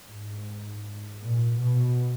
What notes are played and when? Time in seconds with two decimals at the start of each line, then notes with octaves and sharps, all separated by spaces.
0.09 G#2
1.23 A#2
1.60 B2